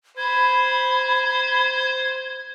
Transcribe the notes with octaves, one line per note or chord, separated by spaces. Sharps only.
C5 B5 G#6